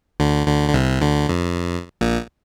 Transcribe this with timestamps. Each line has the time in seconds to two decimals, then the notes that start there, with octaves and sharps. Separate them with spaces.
0.20 D2 D3
0.46 D2 D3
0.69 D3
0.74 C2 C3
1.01 D2 D3
1.29 F2
2.01 A#1 A#2